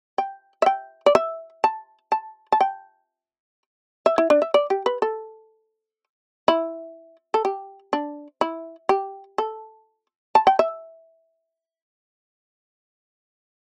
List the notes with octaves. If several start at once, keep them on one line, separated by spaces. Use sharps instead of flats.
G5
E5
G5
D5
E5
A5
A5
A5
G5
E5
E4
D4
E5
D5
G4
B4
A4
E4
A4
G4
D4
E4
G4
A4
A5
G5
E5